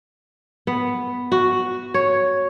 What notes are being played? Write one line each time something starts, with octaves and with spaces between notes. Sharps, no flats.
B3
F#4
C#5